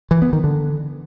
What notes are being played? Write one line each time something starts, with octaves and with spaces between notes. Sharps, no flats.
E3
B3
D#3
D3